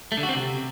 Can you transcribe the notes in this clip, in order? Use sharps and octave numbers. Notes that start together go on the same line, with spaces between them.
A3
D3
F#4
C4
C3